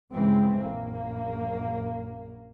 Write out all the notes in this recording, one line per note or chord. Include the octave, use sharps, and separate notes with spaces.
C#2 G2 E3 G#3 C4
A#1 F#2 A#3